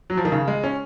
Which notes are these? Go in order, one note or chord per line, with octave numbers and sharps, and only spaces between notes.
F#3
F3
D#3
C#3
G#3
C#4